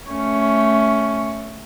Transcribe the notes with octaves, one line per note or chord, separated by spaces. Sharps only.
A3 C#4